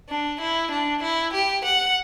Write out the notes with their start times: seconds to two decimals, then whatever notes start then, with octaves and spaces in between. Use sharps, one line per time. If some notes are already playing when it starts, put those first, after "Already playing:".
0.09 D4
0.41 E4
0.71 D4
1.03 E4
1.33 G4
1.64 F#5